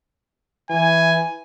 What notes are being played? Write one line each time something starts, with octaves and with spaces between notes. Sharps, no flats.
E3 G#5